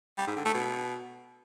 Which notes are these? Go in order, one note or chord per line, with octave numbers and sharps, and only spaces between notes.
G3
G#2
D3
A3
B2